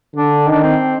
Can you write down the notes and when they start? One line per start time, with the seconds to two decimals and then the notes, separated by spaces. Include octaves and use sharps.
0.16 D3 D4
0.47 D#3 D4
0.63 C4